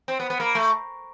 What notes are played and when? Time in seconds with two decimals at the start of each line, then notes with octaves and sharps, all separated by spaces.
0.08 C4
0.20 B3
0.30 B3
0.40 A#3
0.55 A3